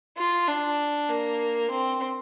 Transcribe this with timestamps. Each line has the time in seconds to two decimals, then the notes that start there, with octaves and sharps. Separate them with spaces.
0.17 F4
0.48 D4
1.09 A#3
1.70 C4